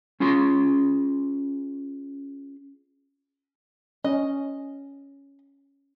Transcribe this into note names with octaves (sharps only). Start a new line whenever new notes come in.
C#4 F4 G#4 C6
C#4 D#5